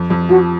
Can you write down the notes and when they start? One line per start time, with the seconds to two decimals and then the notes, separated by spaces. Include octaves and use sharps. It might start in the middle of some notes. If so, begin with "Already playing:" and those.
Already playing: F2
0.10 F2
0.29 F3 F#4